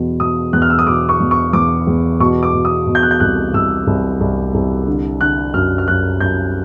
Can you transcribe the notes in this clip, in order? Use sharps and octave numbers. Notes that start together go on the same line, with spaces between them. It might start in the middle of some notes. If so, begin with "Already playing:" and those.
Already playing: E2 B2
B2 D#6
E2 F#6
F6
E6
D#6
B2 D6
C#6
E2
C#6
E2 D6
E2
B2 C#6
D6
B2
D#6
B2
G6
F#6
G6
C2 F#6
C2 E6
C2
C2
C2
D3
D3 F#6
F#2 F6
F6
F#2 F#6
F#2 G6